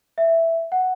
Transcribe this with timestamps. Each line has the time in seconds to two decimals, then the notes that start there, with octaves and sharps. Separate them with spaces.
0.18 E5
0.72 F#5